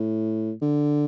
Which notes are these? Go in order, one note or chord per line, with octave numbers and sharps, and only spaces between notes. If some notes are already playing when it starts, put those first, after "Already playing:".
Already playing: A2
D3